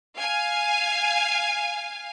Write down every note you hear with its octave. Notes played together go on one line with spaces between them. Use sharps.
F5 G#5